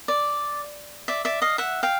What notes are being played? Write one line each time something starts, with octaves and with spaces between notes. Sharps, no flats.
D5
D5 E5
D5 E5
D#5 F5
E5 F#5
F5 G5